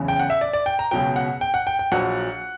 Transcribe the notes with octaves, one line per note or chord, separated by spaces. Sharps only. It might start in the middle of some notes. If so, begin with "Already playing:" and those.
Already playing: F#1 E2 C#3
G5
F#5
E5
D5
D5
G5
A#5
C#2 B2 F#3 G5
F#5
G5
F#5
G5
G5
A#1 A#2 F#3 F#5